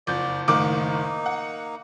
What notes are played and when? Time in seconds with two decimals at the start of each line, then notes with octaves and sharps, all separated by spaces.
0.07 F#1 F2 D5 G6
0.48 F#1 A2 D#3 A#3 D#4 D6
1.26 F#5